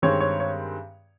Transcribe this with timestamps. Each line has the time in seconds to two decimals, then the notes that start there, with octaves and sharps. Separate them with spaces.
0.02 G2 D#3 G#3 C4 C#5
0.20 C#5
0.40 C#5